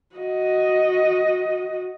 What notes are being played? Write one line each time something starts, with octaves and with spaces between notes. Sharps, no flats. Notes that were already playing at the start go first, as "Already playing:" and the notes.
F#4 D#5